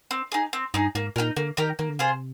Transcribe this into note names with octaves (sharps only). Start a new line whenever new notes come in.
C4
D#4 G#4
C4
G2 D#4 G#4
G#2 A#3
A#2 D#4 G4 A#4
D3 A#3
D#3 D#4 G4 A#4
D#3 A#3
D3
C3 F4 G#4 C5